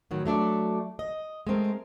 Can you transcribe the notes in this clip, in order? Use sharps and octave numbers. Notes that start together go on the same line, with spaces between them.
A2 D#3 F#3
F#3 A3 D4 D5
D#5
G#3 A3 C4 A#4